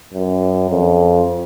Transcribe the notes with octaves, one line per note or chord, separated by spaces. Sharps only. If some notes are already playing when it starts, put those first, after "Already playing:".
F#2
F2